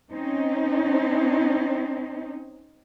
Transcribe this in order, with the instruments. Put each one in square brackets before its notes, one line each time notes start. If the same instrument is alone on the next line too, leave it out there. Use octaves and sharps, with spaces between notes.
[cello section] C4 C#4 D#4